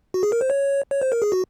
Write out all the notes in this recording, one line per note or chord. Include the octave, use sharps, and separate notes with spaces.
F#4
G#4
A#4
C5
C#5
C#5
C5
A#4
G#4
F#4